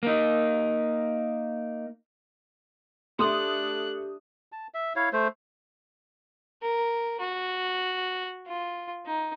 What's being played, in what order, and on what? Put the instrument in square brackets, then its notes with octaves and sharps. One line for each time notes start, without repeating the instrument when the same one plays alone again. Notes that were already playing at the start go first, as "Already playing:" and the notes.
[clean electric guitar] A#3 D#4
[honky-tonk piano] A3 A4 D#6 [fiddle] D4 F#6 [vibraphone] G4 [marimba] E5 C6
[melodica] A5
E5
E4 C#5 F5
A3 C5
[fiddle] A#4
F#4
F4
D#4